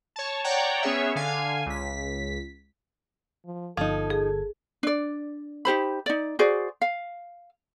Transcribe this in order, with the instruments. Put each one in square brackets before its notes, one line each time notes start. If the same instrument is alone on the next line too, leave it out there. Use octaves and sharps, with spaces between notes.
[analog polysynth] C#5 A5
C#5 D5 F#5 G5 A#5
B3 C#4 G#4 C#5 E5
D3 F5 G#5
C#2 B6
[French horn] F3
[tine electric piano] G1 G#6 [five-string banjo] F3 D#4 [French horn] A4
[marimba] G#4
[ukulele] D4 D5
D#4 G4 C5 B5
D#4 D5
F#4 G#4 C5 D5
F5